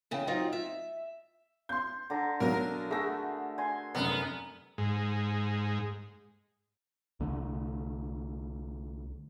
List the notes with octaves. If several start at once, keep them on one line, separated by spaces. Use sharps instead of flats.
E2 C#3 G5
F#3 C4 D#4 F4
E5
C6 G6
D3 A#5
B1 F#3 A#4
A3 F#4 G#4 E5 A#6
G#5 C6
F1 F#2 B3 A#4 D#5
G#2
C2 D3 A3